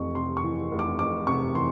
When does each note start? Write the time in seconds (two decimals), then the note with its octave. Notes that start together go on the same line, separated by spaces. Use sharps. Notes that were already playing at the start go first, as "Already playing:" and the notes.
Already playing: F1 F2 E3 C#6
0.15 C3 C6
0.37 C#6
0.44 E3
0.71 F1
0.79 D6
0.99 F2 D6
1.27 C3 C#6
1.55 E3 C6